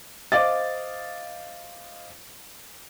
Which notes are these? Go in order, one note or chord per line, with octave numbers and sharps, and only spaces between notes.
C5 D#5 F5 D6 A6